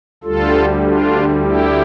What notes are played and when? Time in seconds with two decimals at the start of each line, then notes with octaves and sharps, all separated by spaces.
0.23 D2 D3 G3 F4 A4
0.83 D4 F4
1.42 E4 G4